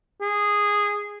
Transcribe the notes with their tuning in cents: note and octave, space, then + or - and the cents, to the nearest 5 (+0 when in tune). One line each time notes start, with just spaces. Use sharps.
G#4 -10